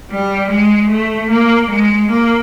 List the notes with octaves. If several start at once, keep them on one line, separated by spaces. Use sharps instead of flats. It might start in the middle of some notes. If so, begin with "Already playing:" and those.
G3
G#3
A3
A#3
G#3
A#3